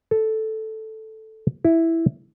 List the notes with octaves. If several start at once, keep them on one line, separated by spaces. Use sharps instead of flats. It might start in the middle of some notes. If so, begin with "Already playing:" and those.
A4
E4